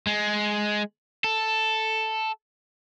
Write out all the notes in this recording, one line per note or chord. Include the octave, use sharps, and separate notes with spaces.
G#3
A4